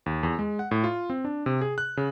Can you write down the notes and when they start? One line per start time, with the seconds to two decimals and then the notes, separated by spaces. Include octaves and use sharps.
0.06 D#2
0.23 E2
0.39 G#3
0.59 F#5
0.71 A2
0.84 F4
1.10 C4
1.25 D4
1.46 C3
1.61 G#4
1.78 F#6
1.97 C#3